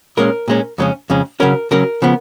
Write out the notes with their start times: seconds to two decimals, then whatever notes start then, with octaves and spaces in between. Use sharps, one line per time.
0.17 A#2 G#3 C#4 A#4
0.48 A#2 G#3 C#4
0.78 F2 C#3 G#3 C#4
1.10 F2 C#3 G#3 C#4
1.40 C#3 F#3 C#4 A#4
1.71 C#3 F#3 C#4 A#4
2.02 C#3 F3 B3